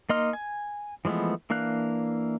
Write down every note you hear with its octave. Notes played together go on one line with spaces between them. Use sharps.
A#3 D#4 D#5 C6 F6
G#5
E3 F3 G#3 A3 B3
E3 A#3 D4 F5 F#6